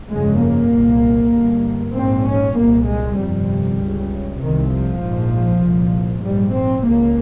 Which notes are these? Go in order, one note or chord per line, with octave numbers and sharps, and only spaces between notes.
G1 F2 C#3 G#3
A#3
C2 A#2
G1 G2
A#1 G#2 C4
C#4
C2 A#2 A#3
G#3
G1 F2 C3 G3
C#2 C#3
C2 C3 D#3
F3
A#1 G#2
C2 A#2
A#1 G#2 G3
C4
C#2 C#3 A#3